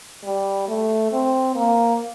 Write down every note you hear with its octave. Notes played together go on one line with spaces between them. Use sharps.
G3
A3
C4
A#3